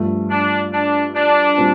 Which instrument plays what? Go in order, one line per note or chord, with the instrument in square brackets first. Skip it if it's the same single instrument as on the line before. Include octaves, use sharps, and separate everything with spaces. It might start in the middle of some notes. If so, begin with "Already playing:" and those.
Already playing: [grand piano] G2 F3 A3
[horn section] D4
D4
D4
[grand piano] A#2 G3 C4